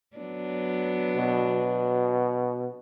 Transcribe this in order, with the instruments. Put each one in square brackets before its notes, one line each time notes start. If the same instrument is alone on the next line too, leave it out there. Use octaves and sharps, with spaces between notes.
[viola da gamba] F#3 B3 D4
[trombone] B2